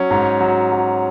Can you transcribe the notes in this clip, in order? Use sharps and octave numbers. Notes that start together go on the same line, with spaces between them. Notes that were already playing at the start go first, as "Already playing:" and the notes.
Already playing: F#3 C#4
G#2
F#3
F#3